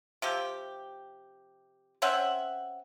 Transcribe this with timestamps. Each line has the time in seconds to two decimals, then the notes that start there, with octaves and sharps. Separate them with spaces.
0.22 C3 F3 G4
2.02 C4 C#4 E5 F#5